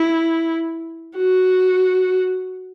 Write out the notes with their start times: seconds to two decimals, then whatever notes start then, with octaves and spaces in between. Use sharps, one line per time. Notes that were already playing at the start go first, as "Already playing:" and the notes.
Already playing: E4
1.18 F#4